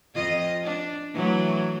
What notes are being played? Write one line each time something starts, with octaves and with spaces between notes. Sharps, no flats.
F2 F4 D#5
D4
E3 F#3 A3